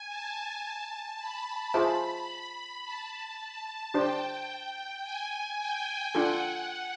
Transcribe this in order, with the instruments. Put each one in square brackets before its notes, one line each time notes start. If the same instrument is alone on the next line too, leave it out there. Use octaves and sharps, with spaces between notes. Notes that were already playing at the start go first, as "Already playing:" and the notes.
Already playing: [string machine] G#5
A5
B5
[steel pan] F4 G#4 C5 E5 A5
[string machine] A5
[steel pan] D4 G4 C5 [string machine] G5
[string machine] G#5
G5
[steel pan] D4 F4 A4 [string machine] F#5